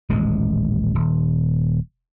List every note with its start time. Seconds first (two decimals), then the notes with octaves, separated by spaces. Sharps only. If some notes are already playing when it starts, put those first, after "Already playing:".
0.09 D#1 A1 G#3
0.95 D#1